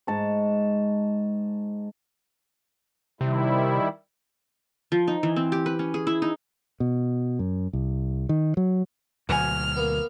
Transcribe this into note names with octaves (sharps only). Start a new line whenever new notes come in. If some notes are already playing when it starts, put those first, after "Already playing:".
G#2 A5 C#6
C3 D#3 G3 E4
F3
D#4
E3
C4
G4
B4
C#4
G#4
E4
D#4
B2
F#2
C2
D#3
F#3
D2 B2 F#3 B4 F#5 G#5 F6
A#3 B3